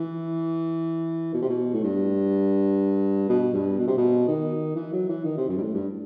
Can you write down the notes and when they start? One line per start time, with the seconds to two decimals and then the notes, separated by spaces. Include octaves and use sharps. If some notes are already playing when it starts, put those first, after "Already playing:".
Already playing: E3
1.34 B2
1.41 C3
1.49 B2
1.74 A2
1.84 G2
3.29 B2
3.53 G2
3.79 B2
3.87 C3
3.97 B2
4.28 D#3
4.75 E3
4.93 F#3
5.09 E3
5.24 D#3
5.37 C3
5.49 F#2
5.57 G2
5.62 A2
5.74 G2